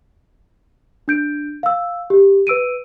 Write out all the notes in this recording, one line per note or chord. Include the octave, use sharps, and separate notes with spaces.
D4 G6 D7
F5 E6
G4
B4 E6 D7 D#7